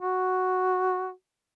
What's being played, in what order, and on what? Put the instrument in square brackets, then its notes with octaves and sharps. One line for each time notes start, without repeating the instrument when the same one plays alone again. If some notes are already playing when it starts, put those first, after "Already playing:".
[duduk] F#4